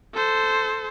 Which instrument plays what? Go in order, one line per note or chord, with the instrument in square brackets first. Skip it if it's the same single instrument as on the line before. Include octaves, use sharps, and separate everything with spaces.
[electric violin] A4 C5